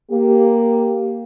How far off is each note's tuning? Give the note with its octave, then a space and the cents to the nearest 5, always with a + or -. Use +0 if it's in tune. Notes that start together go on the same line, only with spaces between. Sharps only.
A#3 +0 G4 +0